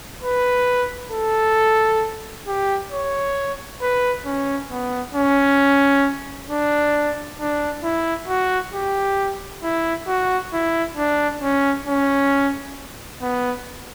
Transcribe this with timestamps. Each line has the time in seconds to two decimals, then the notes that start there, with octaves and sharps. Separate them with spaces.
0.22 B4
1.12 A4
2.47 G4
2.91 C#5
3.81 B4
4.25 C#4
4.70 B3
5.15 C#4
6.50 D4
7.40 D4
7.83 E4
8.28 F#4
8.73 G4
9.63 E4
10.07 F#4
10.53 E4
10.97 D4
11.41 C#4
11.87 C#4
13.21 B3